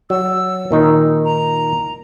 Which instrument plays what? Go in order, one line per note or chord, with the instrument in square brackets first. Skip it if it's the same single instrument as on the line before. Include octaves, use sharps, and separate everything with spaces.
[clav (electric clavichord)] F#3 [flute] E6
[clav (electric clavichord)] A#2 D#3 D#4
[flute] A#5